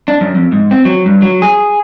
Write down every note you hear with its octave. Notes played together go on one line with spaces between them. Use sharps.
D4
F#2
F2
G#2
C4
F#3
G2
F#3
G#4